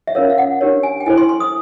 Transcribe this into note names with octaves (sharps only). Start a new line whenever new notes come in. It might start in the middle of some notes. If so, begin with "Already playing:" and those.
E5
C#4 F4 A#4 C#5 F5
F5
F#5
D4 G4 A#4 C#5
G#5
G5
E4 A4 C5 G#5
C6
C6
D#6